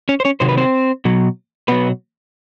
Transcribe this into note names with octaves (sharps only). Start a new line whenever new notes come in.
C#4 C#5
C5
C#4 C#5
C3 D#3 F#3 C5
B4
C4 C5
B2 F#3
B2 F#3 B3 B4